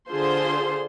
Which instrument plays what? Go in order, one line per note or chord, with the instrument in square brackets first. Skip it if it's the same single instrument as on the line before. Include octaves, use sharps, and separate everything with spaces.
[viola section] D3 F4 G#4 C5 C6